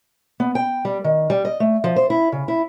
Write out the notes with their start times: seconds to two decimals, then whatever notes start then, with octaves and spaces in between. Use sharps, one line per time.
0.40 B3
0.55 G5
0.85 G3
1.04 D#3
1.30 G3
1.45 D#5
1.60 A3
1.84 F3
1.96 C5
2.10 E4
2.32 C#3
2.48 E4